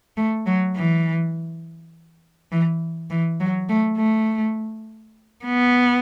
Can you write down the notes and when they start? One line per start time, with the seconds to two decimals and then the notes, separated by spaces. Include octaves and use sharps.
0.17 A3
0.46 F#3
0.76 E3
2.52 E3
3.10 E3
3.40 F#3
3.69 A3
3.98 A3
5.46 B3